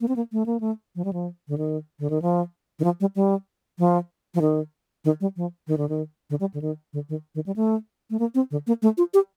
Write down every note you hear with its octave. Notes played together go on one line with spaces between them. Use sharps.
A#3
C4
A#3
A3
A#3
A3
F3
G3
F3
D3
D#3
D3
D#3
F3
D#3
F3
G3
G3
F3
F3
D#3
D#3
G3
F3
D#3
D3
D#3
D3
G3
D3
D#3
D3
D#3
D#3
G3
A3
A3
A#3
C4
D3
A#3
A3
F4
G4